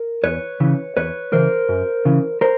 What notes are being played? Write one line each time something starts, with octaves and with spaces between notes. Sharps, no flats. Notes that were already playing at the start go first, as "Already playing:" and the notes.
Already playing: A#4
E2 B4 C#5
C#3 E3
E2 B4 C#5
C#3 E3 A#4 C5
F#2
C#3 E3
A#4 C5